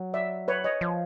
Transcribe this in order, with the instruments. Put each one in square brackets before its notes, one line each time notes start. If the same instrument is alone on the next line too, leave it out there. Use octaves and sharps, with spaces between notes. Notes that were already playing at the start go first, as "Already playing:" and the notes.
Already playing: [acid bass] F#3
[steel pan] D5 E5
B4 C#5
C#5 D#5
[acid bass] F3